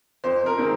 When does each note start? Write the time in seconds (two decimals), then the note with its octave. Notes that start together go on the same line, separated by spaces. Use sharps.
0.24 F2 C5
0.46 A#4
0.57 C3 D#3 G#3 C4